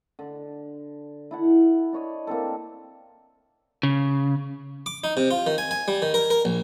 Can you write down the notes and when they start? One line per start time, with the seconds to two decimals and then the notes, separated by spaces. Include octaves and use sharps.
0.19 D3
1.31 E4 A4 F#5
1.93 D4 C#5 D#5
2.27 A#3 C4 A4
3.83 C#3
4.86 D6
5.04 D#4
5.17 C3
5.31 F4
5.47 D#3
5.58 G#5
5.71 G#5
5.88 G3
6.02 D#3
6.14 A#4
6.30 A#4
6.45 A#1